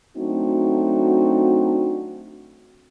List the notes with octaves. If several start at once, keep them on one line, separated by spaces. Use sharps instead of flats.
F#3 A3 C4 D4 D#4 F#4